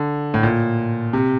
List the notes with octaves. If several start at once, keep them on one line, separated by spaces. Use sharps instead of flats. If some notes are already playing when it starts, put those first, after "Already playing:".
Already playing: D3
A2
A#2
C3